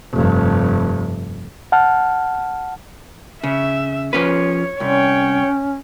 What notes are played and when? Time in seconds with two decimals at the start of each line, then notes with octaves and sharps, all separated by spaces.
0.13 F1 G2
1.72 F#5 A5 F6
3.43 C#3 E5
4.13 F3 C#4 B4 C#5
4.80 C2 C#4 C#5 G5